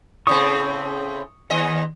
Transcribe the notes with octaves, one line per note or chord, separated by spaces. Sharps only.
A2 C#3 C4 C#6 D#6
D#2 D#5